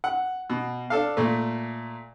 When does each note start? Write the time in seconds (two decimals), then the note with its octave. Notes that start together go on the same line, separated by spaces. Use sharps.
0.04 F#5
0.50 B2
0.90 D4 A4 F5
1.17 A#2 A3